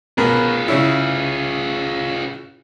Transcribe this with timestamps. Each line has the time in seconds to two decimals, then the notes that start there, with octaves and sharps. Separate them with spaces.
0.18 B2 F4 G#4 A#4 B5
0.68 C#3 C#4 E4